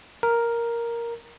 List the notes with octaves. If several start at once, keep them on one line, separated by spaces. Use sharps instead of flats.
A#4